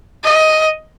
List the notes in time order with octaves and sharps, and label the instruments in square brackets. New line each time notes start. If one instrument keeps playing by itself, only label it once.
[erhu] D#5